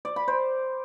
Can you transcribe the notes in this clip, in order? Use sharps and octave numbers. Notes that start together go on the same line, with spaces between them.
D5
B5
C5